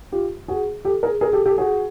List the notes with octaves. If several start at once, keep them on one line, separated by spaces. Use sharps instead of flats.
F4 G4
F#4 G#4
G4 A4
G#4 A#4
G#4 A#4
G4 A4
G4 A4
F#4 G#4